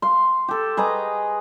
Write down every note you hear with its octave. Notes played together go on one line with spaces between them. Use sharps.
F5 C6
G4 A4
G#4 B4 D#5 A#5